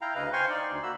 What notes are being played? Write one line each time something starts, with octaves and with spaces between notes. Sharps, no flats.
E4 F5 G5 A#5
D2 C#3 B4 D#5 F5
C5 F5 G5 G#5 C6 C#6
D#4 D5
D2
A#3 F#4 B5 E6